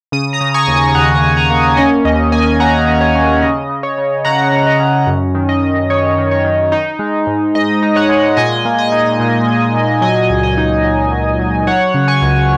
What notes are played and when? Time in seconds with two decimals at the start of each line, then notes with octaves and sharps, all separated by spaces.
0.12 C#3 D#6
0.33 A#5 D#6
0.41 C#3
0.54 G#5 C#6
0.67 D#2
0.95 D#2 F#5 A#5
1.22 D#2
1.37 F#5 A#5
1.50 A#3
1.77 C#4 D#5 G#5
2.05 D#2 D#5
2.32 A#3 D#5 G#5
2.60 A#3 F#5 A#5
2.88 C#4
3.01 C#5
3.15 C#4
3.42 C#3 D#5
3.69 C#3
3.83 C#5
3.98 C#3
4.25 C#3 F#5 A#5
4.52 C#3
4.67 D#5
4.80 C#4
5.07 F#2
5.35 D#3
5.49 D#5
5.63 D#3
5.90 D#3 C#5
6.18 D#3
6.31 C#5
6.45 D#3
6.72 D#4
6.99 G#3
7.27 G#2
7.55 G#2 D#5
7.83 D#4
7.96 C#5 F#5
8.09 G#3
8.37 A#2 D#5 G#5
8.65 A#3
8.78 D#5
8.92 D#4
9.20 A#2
9.47 A#2
9.74 A#2
10.01 F#3 D#5 G#5
10.30 C#2
10.43 D#5
10.58 D#4
10.84 F#3
11.11 F#3
11.39 F#3
11.67 F#3 C#5 F#5
11.94 C#3
12.08 G#5 C#6
12.22 C#2